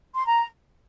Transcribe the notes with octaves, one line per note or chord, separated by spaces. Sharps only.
C6
A#5